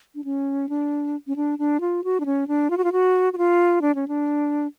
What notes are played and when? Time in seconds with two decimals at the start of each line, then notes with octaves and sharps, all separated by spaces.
0.15 D4
0.24 C#4
0.69 D4
1.27 C#4
1.36 D4
1.59 D4
1.80 F4
2.04 F#4
2.20 D4
2.26 C#4
2.48 D4
2.70 F4
2.77 F#4
2.84 F4
2.92 F#4
3.33 F#4
3.38 F4
3.82 D4
3.95 C#4
4.08 D4